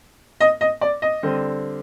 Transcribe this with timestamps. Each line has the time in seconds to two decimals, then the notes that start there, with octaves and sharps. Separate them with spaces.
0.40 D#5
0.61 D#5
0.81 D5
1.02 D#5
1.23 D3 G3 C4